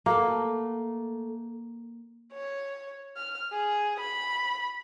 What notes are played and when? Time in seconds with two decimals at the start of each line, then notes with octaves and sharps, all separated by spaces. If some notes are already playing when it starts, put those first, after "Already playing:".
0.06 A3 A#3 F#4 A4
2.33 C#5
3.17 F6
3.53 G#4
4.00 B5